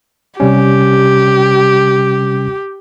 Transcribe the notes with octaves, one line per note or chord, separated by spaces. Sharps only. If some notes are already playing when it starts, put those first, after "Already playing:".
C3 G3 C#4 G4